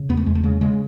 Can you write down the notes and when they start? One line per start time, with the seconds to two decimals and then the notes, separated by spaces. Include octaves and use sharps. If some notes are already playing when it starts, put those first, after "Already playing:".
Already playing: C#3
0.09 E2 B3
0.17 A3
0.26 E2 G#3
0.35 A3
0.43 C#3 G#3
0.61 C#3 G#3